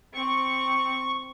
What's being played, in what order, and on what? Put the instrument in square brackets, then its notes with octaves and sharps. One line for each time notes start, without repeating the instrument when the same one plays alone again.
[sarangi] C4 [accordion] C#6